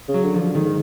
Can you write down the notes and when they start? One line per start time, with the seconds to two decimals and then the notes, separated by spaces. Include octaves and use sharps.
0.08 C#3
0.14 F#3
0.24 D3
0.34 F3
0.40 D3
0.55 G#2 D#3